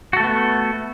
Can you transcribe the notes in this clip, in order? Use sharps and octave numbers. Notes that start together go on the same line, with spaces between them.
A3 B3 F#4 A4